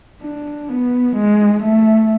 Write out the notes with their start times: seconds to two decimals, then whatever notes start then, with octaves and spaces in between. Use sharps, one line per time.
0.22 D4
0.69 B3
1.15 G#3
1.62 A3